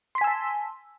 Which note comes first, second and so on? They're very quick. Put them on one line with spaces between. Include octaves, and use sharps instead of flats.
C6 B6 G#5 E6 A5